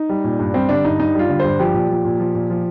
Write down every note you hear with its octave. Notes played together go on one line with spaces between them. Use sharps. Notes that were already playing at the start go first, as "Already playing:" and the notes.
Already playing: D#4
G3
A#2
G2
G3 C4
D3 D4
G2 D#4
G2 D#4
G3 F4
D3
G2 C5
F3 G4
A#2
F3
A#2
F3
A#2
F3